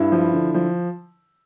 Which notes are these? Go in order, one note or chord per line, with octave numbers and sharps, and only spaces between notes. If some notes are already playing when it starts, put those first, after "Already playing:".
Already playing: G2 E4
F3
D3
F3